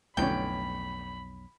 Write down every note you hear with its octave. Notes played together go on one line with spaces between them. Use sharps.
B1 F2 A2 D3 C#4 G5 B5